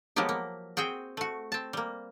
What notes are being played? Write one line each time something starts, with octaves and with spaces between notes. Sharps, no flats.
F3 F#3 G#3 A#3 B3 G4
A#3
C4 F#4 G#4 G5
A3 F#4
C4 A5
G3 A#3